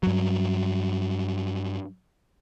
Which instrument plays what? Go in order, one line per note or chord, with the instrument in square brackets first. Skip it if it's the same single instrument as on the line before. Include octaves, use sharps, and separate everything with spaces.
[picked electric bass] G2 F#3